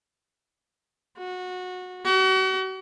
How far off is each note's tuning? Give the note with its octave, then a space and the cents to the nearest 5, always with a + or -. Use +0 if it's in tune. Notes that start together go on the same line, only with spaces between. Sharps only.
F#4 -20
F#4 +40